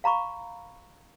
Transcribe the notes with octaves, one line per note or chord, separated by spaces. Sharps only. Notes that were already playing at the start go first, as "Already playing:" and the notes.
F5 A#5 B5 C#6